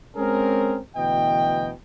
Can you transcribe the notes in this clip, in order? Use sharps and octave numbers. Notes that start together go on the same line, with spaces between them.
G#3 C4 C#4 G#4 A#4
D2 B2 E3 D#5 G5